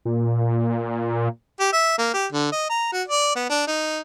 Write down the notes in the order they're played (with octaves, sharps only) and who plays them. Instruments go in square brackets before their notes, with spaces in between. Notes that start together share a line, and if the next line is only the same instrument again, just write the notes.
[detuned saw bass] A#2
[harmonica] G4
E5
A#3
G4
D3
D#5
A#5
F#4
D5
B3
D4
D#4